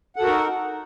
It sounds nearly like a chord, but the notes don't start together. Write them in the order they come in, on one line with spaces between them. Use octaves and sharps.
F#5 A4 F#4 A#4 D#4